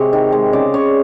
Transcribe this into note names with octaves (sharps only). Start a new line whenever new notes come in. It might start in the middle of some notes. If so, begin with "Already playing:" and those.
Already playing: C3 G#3 C#5
D#3
G#3
C#3 D5
C#3 C#5